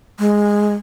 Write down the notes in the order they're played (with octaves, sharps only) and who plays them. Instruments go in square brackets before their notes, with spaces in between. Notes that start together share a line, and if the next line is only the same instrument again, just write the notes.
[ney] G#3